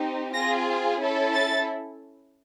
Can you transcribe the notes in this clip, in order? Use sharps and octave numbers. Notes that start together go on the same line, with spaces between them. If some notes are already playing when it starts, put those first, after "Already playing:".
Already playing: C4 D#4 G4
C4 F4 G#4 A#6
C#4 E4 A4
A6